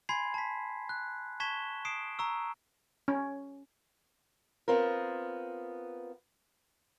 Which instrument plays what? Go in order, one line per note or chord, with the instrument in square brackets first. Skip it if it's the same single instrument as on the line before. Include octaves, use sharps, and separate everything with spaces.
[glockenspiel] G#5 B5 C6 G#6 C7
A5 B6
F#6
A5 C#6 G#6 B6 E7 G7
D#6 C7 D7 E7
A#5 C#6 E6
[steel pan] C#4
[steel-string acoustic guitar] B3 C4 F4 A#4